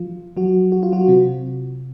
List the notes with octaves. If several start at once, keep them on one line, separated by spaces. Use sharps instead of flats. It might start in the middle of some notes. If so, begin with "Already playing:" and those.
Already playing: F3 F4
F#3 F#4
F#4
F4
F#3 F#4
C3 C4